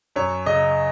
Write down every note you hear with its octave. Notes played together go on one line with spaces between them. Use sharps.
F#2 C#5
C#3 D#5